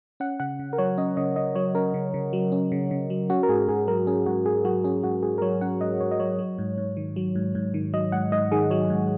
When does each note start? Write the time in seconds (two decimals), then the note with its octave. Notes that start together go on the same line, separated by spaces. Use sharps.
0.20 C#4 F#5
0.40 C#3 F#5
0.59 C#3
0.73 A#4
0.78 F#3 C#5
0.98 C#4 D#5
1.17 C#3 D#5
1.36 C#3 D#5
1.55 F#3 C#5
1.75 C#4 A#4
1.94 C#3
2.14 C#3
2.33 F#3
2.52 C#4
2.72 C#3
2.91 C#3
3.10 F#3
3.30 C#4 F#4
3.43 A#4
3.49 G#2 G#4
3.68 G#2 G#4
3.88 F#3 A#4
4.07 C#4 G#4
4.26 G#2 F#4
4.46 G#2 G#4
4.65 F#3 F#4
4.84 C#4 G#4
5.03 G#2 F#4
5.23 G#2 G#4
5.38 A#4
5.42 F#3 C#5
5.61 C#4 F#5
5.81 G#2 D#5
6.00 G#2 C#5
6.11 D#5
6.20 F#3 C#5
6.39 F#3
6.58 G#2
6.78 G#2
6.97 D#3
7.16 F#3
7.35 G#2
7.55 G#2
7.74 D#3
7.93 F#3 D#5
8.12 G#2 F#5
8.32 G#2 D#5
8.52 D#3 G#4
8.71 F#3 C#5
8.90 G#2